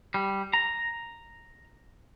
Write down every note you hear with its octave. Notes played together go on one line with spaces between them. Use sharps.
G3
A#5